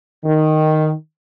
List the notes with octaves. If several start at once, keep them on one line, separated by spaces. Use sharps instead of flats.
D#3